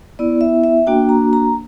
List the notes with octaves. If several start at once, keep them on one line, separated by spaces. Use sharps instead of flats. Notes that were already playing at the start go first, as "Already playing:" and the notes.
B3 E4 D5
E5
E5
A#3 D4 F#4 G5
A#5
A#5